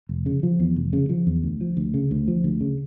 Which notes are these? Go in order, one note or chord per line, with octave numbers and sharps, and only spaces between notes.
F1
C#3
F3
E2
F1
C#3
F3
E2
D2
F3
D2
C#3
D2
F3
D2
C#3